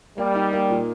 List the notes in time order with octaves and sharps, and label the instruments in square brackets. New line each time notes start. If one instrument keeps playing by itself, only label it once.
[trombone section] G3 [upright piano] A#3
[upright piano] D#4
A#3
A#2